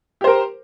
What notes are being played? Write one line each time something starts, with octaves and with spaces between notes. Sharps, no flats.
G4 A#4 C5